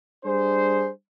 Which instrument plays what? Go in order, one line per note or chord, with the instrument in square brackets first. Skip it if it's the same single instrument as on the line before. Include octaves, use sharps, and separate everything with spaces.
[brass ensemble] G3 D4 G#4 C5